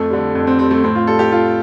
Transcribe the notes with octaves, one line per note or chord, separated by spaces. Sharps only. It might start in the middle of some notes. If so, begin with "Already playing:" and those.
Already playing: F2 A3
D3 G3
F2
C4
D3 G3 C4
A3
A2 C4
F4
G3 A4
G4
A2 F4